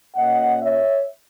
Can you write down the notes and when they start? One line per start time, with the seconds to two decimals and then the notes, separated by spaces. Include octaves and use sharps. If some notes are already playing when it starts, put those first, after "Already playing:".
0.15 A#2 A#3 C#4 D#5 F#5
0.62 C#5 E5